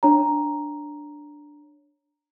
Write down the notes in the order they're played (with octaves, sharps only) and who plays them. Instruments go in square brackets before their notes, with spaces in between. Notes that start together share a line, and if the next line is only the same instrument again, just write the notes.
[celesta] D4 C#5 A#5